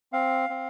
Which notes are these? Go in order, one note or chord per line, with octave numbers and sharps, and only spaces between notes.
C4 F5
C4